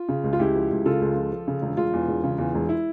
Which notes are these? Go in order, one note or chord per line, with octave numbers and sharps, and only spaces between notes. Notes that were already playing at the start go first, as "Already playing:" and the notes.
Already playing: F4
C#3
C#2
F4
C#2 E4 G4
F3
C#2
C#3 F4 A4
C#2
F3
F3
C#3
E1
E1 F4
E2
E1
C#3
E2
E1
E4